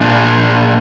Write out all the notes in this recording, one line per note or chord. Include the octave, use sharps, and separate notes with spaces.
A#2 D4